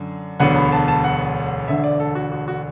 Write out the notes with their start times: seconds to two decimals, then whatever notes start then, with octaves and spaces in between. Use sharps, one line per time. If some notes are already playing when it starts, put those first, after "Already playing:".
Already playing: F#2 D3
0.40 E1 D2 D3 F#3 B3 F#5
0.56 B5
0.72 A5
0.88 A5
1.04 F#5
1.68 E1 D2 D3 E5
1.84 D5
2.00 A4
2.15 F#4
2.32 F#4
2.48 F#4